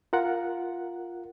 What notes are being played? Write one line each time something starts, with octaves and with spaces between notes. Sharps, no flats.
F4 A#4 F#5